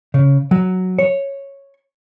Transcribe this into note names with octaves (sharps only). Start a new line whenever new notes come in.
C#3
F#3
C#5